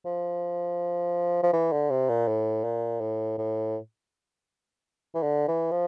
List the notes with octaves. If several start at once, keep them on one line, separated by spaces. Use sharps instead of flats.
F3
F3
E3
D3
C3
A#2
A2
A#2
A2
A2
E3
D3
E3
F3